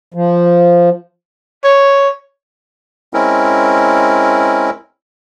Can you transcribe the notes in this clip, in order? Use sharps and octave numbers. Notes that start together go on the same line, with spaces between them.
F3
C#5
G#3 C4 C#4 E4 A#4